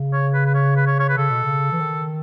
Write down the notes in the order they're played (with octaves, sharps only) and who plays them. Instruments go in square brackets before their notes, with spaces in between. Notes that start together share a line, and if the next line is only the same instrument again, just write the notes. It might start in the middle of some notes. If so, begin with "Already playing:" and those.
Already playing: [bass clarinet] C#3
[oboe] C#5
B4
B4
C#5
B4
C#5
C#5
B4
[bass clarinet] C#3 [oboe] A4
[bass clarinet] B2
C#3
E3
D#3